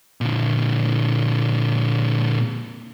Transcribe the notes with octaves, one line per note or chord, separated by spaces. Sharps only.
A#2 D3